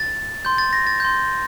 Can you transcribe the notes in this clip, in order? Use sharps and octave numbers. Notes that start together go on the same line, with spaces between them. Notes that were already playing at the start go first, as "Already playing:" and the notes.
Already playing: A6
C6 G6
A6
A#6
A6
C6 G6